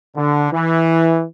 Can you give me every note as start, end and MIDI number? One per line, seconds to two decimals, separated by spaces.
0.15 0.47 50
0.52 1.22 52